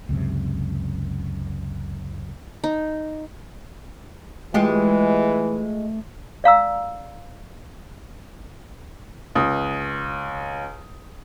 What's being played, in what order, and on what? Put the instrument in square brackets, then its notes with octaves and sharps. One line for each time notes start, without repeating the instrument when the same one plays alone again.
[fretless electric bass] C#2 F#2 C3
[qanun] D#4
[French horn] E3 [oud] G#3 F4 G4 [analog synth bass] A3
[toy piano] D5 F5 A#5 E6
[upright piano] C#2 D#6